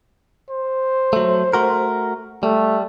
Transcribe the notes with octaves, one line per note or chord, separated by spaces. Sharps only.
C5
F#3 A3
A3 F#4 A#4
G3 A3